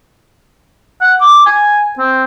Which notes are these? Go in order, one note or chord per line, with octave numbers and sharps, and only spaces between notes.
F#5
D6
G#5
C4